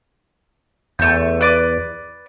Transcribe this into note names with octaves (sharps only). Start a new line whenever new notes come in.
E2 A3 G6
B4 D5 D6